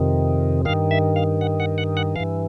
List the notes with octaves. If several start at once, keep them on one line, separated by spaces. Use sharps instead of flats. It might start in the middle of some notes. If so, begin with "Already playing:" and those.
Already playing: F2 C3 D#3
G2 D#3 F5
E5
F5
F#5
F#5
F#5
F#5
G2 E3 F5